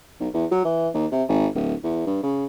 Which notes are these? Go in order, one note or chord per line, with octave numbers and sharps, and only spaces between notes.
B1
E2
F#3
E3
D#2
C3
G#1
D1
E2
G2
C#3